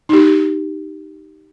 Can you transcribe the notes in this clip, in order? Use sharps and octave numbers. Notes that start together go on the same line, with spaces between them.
D#4 G4